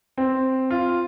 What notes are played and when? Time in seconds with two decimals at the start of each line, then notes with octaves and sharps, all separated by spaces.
0.18 C4
0.70 F4